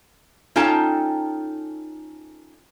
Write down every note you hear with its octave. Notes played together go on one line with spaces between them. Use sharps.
C#4 D#4 F4 A4 G5 A5